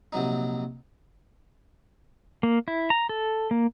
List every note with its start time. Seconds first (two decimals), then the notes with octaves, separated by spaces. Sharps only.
0.13 A#1 C3 F#3 D#4
2.43 A#3
2.68 E4
2.90 A#5
3.09 A4
3.51 A#3